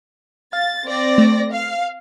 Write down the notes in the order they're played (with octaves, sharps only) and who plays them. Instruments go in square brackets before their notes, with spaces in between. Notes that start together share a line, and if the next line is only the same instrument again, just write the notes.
[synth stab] F5 [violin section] A6
[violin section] C4 D5 A#6
[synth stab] A3
[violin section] F5